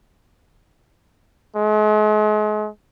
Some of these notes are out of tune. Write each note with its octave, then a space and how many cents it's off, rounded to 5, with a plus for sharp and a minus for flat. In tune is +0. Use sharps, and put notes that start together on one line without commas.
G#3 +40